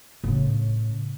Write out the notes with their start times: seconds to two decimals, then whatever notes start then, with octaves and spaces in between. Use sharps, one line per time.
0.24 A2 C#3